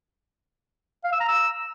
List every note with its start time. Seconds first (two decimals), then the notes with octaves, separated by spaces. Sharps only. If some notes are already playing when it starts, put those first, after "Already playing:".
1.04 F5
1.12 E6
1.20 A#5
1.28 E6